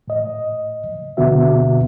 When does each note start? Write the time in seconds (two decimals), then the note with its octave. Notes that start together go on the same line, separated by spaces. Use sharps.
0.08 A2 D#5
1.17 D2 B2 D3 B3 F#4 E5